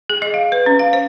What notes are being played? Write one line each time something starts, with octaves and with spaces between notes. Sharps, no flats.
G#4
D#5
F5
B4
C#4
F5
C5